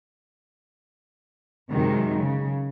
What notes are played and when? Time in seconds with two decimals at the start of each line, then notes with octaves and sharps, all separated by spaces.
1.70 F#2 C3 D#3 F#3 G#3
2.17 C#3